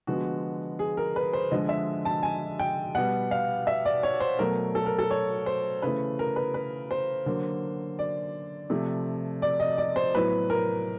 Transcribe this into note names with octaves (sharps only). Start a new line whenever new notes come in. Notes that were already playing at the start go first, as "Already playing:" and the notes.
D3 F3 G#3 B3 F#4
G#4
A#4
B4
C5
D3 F3 G#3 D#5
E5
A5
G#5
G5
B2 G3 B3 F#5
F5
E5
D5
C#5
C5
B2 F#3 A3 A#4
A4
A#4
A4
C#5
C5
C#3 E3 A3 B4
A#4
B4
B4
C5
D3 F#3 A#3
D5
C3 F3 A3
D5
D#5
D5
C5
A2 F#3 B3 B4
A#4